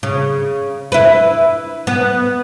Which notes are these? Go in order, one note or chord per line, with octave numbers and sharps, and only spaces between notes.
C#3
E4 B4
B3